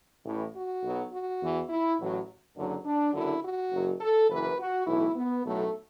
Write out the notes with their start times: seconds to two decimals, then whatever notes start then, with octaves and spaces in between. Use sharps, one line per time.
0.25 A1 A2 E3
0.54 F#4
0.84 B1 B2 F#3
1.11 F#4
1.41 E2 E3
1.69 E4
1.99 A1 A2 F#3
2.57 F#1 F#2 D3 F#3
2.85 D4
3.14 F#1 F#2 D3 F#3 E4
3.43 F#4
3.72 F#1 F#2 F#3
4.01 A4
4.30 F#1 F#2 E3 B4
4.59 F#4
4.87 B1 A2 E3 E4
5.16 B3
5.45 B1 A2 F#3 A3